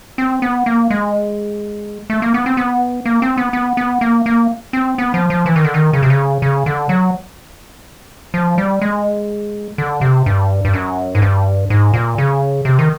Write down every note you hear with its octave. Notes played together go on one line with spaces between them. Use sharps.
C4
B3
A#3
G#3
A3
A#3
B3
C4
B3
A#3
C4
B3
B3
B3
A#3
A#3
C4
B3
F3
F3
E3
D#3
D3
D#3
C#3
C3
C#3
C#3
D3
F#3
F3
G3
G#3
D3
C3
G2
G2
F#2
G#2
G2
G#2
A#2
C#3
C3
D#3